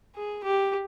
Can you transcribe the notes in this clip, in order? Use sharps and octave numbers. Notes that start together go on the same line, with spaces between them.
G#4
G4